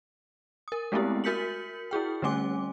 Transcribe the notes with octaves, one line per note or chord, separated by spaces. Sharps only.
A#4 D#6
G#3 A3 B3 C4 E4 G4
F#4 A#4 G6 B6 C#7 F#7
E4 F#4 G#4 G5
D3 G3 A3 C#4 G#5 D6